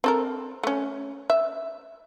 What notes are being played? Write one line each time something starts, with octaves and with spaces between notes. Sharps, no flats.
C4 A4 A#4
A3 C#4
E5